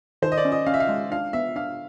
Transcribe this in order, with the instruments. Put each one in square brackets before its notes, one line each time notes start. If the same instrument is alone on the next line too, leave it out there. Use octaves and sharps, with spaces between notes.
[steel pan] D#3 [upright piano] C5
[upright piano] D#5
D5
[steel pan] C#4
[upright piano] D#5
[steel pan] C#4 [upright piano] F5
[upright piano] E5
F5
[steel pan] G#3
[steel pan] D4 [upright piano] F5
[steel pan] B3 [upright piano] E5
[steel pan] D4 [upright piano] F5